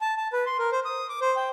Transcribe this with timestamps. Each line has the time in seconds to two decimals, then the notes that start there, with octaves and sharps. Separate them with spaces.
0.01 A5
0.17 A5
0.33 B4
0.46 C6
0.59 A#4
0.72 C5
0.85 D#6
1.09 D6
1.21 C5
1.36 G5